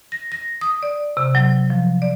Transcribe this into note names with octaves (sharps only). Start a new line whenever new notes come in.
A#6
A#6
D#6
D5
C3
F#3
F3
D5